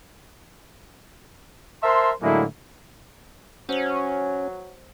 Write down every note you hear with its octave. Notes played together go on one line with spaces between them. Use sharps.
A#4 C5 E5 A5 C6
A2 D3 F#3 G#3 A#3 E4
F#3 C#4 C5 F#7